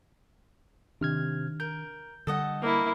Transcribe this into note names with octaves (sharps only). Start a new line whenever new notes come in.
C3 D#3 D4 F6 G#6
A#4 G6
D3 G3 A4 D#5 F#5
A#3 E4